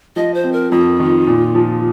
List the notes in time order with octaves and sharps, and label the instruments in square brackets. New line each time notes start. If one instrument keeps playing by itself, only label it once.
[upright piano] F3 [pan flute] D#5
[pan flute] C5
[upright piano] C4
[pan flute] A#4
[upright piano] F2 [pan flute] F4
[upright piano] D#3
A#2
F3